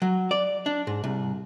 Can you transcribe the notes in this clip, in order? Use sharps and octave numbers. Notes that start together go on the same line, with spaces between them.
F#3
D5
D4
G#2
C2